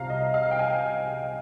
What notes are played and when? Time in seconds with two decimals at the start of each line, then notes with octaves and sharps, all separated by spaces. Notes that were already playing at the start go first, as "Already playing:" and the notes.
Already playing: C2 C3 F3 F5 A#5
0.10 D#5
0.34 F5
0.51 G5
0.59 G#5